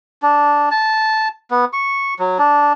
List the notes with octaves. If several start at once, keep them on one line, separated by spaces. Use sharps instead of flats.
D4
A5
B3
C#6
F#3
D4